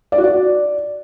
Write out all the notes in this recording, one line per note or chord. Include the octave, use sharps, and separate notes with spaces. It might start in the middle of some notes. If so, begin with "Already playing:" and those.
D5
F#4
D5